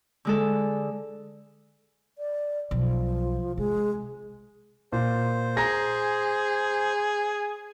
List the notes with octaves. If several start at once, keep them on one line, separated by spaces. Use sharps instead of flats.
D3 G#3 A4
D5
B1 F3
C3 G#3
A#2 C5
G#4 A#5 A#6